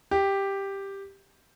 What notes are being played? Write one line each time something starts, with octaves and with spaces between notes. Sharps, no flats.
G4